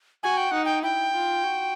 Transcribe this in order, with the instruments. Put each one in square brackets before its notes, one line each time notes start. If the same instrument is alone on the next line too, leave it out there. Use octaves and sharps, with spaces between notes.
[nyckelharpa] F#4 [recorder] G#5
[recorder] G5
[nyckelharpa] D#4 [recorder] F#5
[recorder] G5
[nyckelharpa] E4 [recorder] G5
[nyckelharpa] F4
F#4